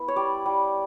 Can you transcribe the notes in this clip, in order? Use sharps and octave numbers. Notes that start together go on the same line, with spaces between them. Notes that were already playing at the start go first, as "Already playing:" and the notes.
Already playing: B3 E4
C#5
G3 D5
G3